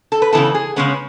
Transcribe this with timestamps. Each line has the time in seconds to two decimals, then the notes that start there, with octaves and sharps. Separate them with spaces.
0.12 A4
0.22 B4
0.33 C#3 E3 B3 A4
0.55 G#4
0.76 C#3 G#3 B3 C#4